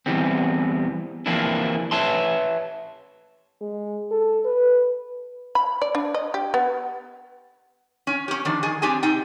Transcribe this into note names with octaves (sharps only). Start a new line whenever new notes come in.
E2 G#2 E3 G3 B3 C4
E3 F3 A#3 C4 D4 E4
B4 C#5 E5 A5 C6
G#3
A4
B4
B5
D5
D4
D#5
G4
B3
C#4
C#4 G4
D#3 F3 D4
D#3 G#4 G#5
C4 D4 G4 G#4 G#5
C3 D#4 G5